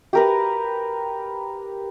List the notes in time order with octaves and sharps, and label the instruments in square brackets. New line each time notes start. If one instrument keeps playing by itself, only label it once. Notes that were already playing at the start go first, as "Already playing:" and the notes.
[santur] G4 A#4 B4